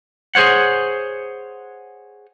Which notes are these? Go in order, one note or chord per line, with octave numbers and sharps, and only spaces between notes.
G#4 A4 C5 C#5 F#5